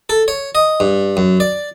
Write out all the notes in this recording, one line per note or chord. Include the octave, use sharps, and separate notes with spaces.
A4
C#5
D#5
G2
F#2
D5